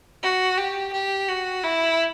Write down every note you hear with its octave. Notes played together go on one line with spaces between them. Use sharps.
F#4
G4
G4
F#4
E4